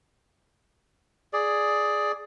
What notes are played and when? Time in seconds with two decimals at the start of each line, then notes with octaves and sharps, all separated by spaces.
1.33 G#4 D5